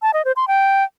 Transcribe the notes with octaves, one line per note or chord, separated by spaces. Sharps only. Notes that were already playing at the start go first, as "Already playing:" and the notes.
A5
D#5
C5
C6
G5